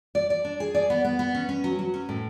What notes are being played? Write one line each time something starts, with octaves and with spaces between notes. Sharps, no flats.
D5
D5
D4
G#4
D5
B3
B3
B3
C#4
C#4
F#3
F#3
C#4
A2